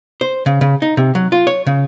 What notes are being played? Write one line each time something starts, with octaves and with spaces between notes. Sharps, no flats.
C5
C#3
C#3
D#4
C3
F#3
F4
C#5
C#3